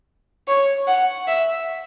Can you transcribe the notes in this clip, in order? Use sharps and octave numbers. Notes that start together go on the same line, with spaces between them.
C#5
F#5
E5